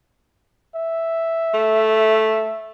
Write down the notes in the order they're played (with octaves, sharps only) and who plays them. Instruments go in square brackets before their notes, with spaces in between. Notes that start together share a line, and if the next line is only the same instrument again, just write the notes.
[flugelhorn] E5
[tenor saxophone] A3